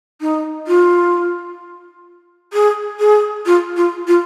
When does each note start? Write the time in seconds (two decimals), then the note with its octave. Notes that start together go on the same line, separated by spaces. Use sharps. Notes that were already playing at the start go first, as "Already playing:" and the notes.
0.21 D#4
0.67 F4
2.53 G#4
2.99 G#4
3.46 F4
3.76 F4
4.07 F4